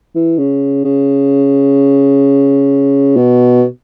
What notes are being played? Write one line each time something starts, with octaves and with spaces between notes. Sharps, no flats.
E3
C#3
C#3
B2